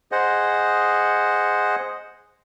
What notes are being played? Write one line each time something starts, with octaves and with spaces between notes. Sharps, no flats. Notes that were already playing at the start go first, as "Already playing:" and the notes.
G#4 C5 D#5 F#5